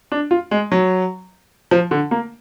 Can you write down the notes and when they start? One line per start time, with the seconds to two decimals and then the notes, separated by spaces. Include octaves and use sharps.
0.12 D4
0.31 F4
0.51 G#3
0.72 F#3
1.71 F3
1.91 D3
2.11 A#3